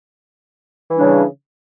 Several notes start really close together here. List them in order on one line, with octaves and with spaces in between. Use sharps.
E3 G3 D4 C#3